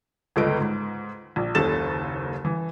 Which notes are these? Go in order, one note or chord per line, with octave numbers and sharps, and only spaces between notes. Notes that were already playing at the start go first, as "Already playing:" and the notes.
G1 C#2 A4 B4 D#5 D7
G#2
A#1
F#1 D#2 C#3 A4 A6 E7
E3